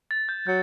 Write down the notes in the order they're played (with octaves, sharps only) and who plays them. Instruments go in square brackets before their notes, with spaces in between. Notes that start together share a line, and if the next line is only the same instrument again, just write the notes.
[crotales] A6
G6
[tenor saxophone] F#3 [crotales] G6